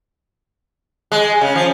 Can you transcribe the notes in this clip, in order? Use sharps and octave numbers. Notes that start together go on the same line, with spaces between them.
G#3
C#3
F3